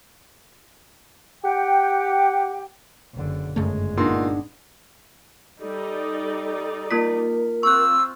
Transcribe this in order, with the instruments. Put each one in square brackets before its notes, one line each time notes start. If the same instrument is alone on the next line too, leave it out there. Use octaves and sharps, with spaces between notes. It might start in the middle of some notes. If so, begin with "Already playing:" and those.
[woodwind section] G4 F#5 G5
[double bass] F#1 D3
[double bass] G1 G#3 [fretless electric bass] F#2 C#3 A3
[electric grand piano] A#2 C6 [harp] B3 D4 D#4
[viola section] G3 D#4 D5 [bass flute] A4
[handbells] A#3 F4 B6 [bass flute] A#4
[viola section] C4 F4 [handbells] C#6 F#6 [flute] E6